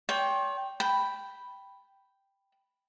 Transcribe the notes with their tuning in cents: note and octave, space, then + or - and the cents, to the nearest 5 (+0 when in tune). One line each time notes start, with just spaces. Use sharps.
C#5 +45 G5 +0 C6 +45
G5 +0 B5 +0